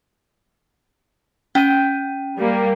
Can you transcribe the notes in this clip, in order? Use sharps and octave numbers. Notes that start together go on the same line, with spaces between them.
C#4 G5 D#7
G3 A#3